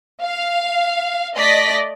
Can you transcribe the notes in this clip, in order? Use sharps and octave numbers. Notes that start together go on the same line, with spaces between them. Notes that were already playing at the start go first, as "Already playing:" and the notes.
F5
A3 D5 D#5 A#6 B6